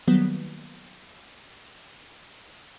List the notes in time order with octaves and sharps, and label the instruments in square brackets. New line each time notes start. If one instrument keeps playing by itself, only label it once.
[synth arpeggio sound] D#3 F#3 G3 A#3 B3